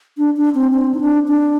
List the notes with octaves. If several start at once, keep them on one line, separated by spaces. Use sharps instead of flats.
D4
D4
C4
C4
D#4
D4
D4